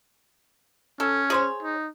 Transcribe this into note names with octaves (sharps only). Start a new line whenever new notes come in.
C#4 A4
G#4 C5 C#5
D#4